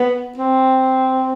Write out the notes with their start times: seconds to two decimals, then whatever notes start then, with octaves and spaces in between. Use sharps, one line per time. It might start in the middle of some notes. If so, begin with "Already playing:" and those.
Already playing: B3
0.38 C4